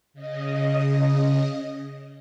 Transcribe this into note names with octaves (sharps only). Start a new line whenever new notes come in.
C#3 D#5